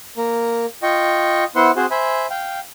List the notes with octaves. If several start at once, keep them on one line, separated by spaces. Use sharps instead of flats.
A#3 A#4
F4 D#5 G5 C#6
B3 E4 C5 F#5 C6
C4 F#4 G#4 C5
C5 E5 G#5 B5
F5 G5